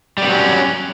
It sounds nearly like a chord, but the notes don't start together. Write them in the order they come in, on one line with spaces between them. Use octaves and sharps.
G3 B3 F#3 C#4